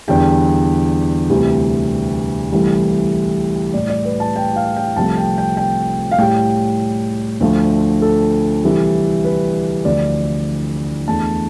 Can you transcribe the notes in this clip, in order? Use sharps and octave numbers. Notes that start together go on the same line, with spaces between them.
E2 D3 G3 G5
D2 C3 E3 G3
C2 C3 E3 A3
A2 G3 D5
D5
B4
A5
G5
F5
G5
C2 C3 F3 A3 A5
G5
G5
G5
F5
A2 G3 G5
D2 D3 F3 A3
A4
C2 C3 E3 G3
B4
D2 D3 F3 D5
E2 D3 A3 A5